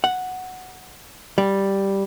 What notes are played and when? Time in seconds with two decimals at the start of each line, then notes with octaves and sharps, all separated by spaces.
0.04 F#5
1.38 G3